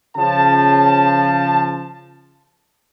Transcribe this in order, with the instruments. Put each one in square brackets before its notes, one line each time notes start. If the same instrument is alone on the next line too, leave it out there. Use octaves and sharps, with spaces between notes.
[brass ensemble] C#3 F3 A5